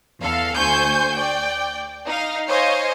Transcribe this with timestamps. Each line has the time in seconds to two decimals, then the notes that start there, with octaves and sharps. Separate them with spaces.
0.21 E2 A4 F5
0.54 D2 C5 G#5 C#6 G6
1.15 D5 G5
2.05 D#4 F5
2.47 C5 C#5 D#5 F5 G#5